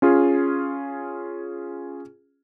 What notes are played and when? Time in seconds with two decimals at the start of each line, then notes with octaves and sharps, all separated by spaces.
0.02 C#4 F4 G#4